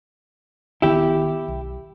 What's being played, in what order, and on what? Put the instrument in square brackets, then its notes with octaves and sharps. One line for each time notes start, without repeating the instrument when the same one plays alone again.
[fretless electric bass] D#1 D#3 B3 [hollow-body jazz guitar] E4 G4
[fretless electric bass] B1